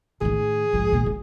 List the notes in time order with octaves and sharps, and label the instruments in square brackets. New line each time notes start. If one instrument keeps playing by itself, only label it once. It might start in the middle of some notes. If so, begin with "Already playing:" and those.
[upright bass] A2 D#3 [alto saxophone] G#4
[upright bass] F2 G#2
A#2 E3
F#2